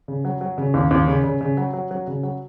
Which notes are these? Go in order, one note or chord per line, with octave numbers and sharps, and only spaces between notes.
C#3
F#3
F#3
C#3
D#2
D#2
C#3
C#3
C#3
F#3
F#3
F#3
C#3
F#3